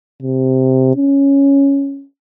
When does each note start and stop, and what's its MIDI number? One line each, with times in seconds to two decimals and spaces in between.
0.22 0.94 48
0.96 2.05 61